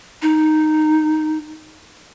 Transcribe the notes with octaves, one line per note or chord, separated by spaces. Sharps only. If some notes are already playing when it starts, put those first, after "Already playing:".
D#4